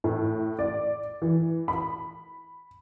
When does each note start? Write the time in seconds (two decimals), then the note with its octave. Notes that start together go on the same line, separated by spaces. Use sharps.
0.04 A2
0.59 D5
1.22 E3
1.68 B5